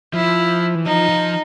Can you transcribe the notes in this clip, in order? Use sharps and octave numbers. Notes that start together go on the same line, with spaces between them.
F3 E4
E3
F3 D#4
F3